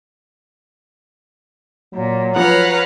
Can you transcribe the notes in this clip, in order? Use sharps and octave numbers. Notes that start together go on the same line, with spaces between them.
A#2 F#3
F3 B4 C#5 F5 F#5 A#5